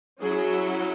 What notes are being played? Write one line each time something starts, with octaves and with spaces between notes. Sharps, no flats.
F#3 C#4 E4 G#4